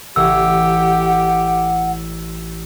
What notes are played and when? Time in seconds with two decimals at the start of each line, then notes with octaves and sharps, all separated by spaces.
0.16 A1 G4 F#5 E6